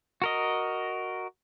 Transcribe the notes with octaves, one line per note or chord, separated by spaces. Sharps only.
F#4 A#4 D#5